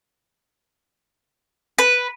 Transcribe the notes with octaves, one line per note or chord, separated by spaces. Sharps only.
B4